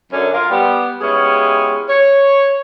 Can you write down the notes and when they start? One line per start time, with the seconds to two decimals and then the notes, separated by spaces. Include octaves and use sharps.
0.12 F#2 D3 C#4
0.34 F4 A#4 F5
0.50 G3 B3 G4
1.02 G#3 B3 C#4 E4 G4 G#4
1.89 C#5